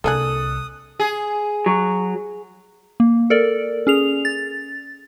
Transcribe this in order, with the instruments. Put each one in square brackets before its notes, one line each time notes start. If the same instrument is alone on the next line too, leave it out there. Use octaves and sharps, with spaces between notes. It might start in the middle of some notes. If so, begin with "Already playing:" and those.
[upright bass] C2 [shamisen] A#3 D4 G#4 [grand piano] A4 F#6 [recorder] D#6
[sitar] G#4
[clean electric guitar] F#3
[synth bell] A#3
A4 A#4 D5
C#4 G#4 F7
A6